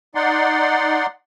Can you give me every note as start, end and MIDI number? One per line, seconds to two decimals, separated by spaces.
0.15 1.06 63
0.15 1.06 74
0.15 1.06 78
0.15 1.06 84